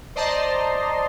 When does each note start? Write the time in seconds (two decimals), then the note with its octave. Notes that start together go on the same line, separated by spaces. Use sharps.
0.16 C5 D5 D#5 A5 A#5 C6